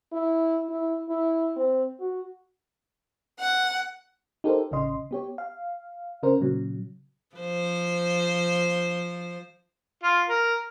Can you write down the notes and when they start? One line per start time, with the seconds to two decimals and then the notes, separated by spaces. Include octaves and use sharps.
0.12 E4
0.69 E4
1.09 E4
1.56 C4
2.00 F#4
3.40 F#5
4.44 D#4 G4 A4 A#4 C5
4.71 A1 C#3 C#4 D#5 C6
5.11 B3 G4 C#5
5.38 F5
6.23 C#3 C#4 A#4 C5
6.41 A#2 C#3 F#3
7.36 F3 C5
10.03 F4
10.29 A#4